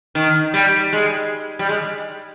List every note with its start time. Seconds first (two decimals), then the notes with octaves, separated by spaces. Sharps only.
0.15 D#3
0.54 G3
0.93 G#3
1.59 G3
1.69 G#3